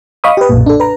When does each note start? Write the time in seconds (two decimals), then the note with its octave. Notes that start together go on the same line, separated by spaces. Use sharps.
0.24 D#5 F5 B5 C#6 D#6
0.37 G4 B4
0.49 B1 F#2 A#2
0.66 D4 A4
0.80 B4 A#5